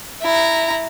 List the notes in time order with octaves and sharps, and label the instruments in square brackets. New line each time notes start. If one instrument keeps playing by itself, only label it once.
[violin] E4 A#5